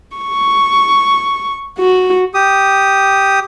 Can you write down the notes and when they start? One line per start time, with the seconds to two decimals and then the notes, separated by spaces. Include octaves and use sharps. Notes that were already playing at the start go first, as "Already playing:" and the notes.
0.17 C#6
1.79 F#4
2.34 G4 D#6